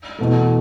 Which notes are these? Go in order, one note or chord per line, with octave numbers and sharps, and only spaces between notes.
E2 B2 A3